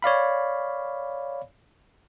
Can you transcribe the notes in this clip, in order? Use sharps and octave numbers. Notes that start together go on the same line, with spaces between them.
C#5 D5 F5 B5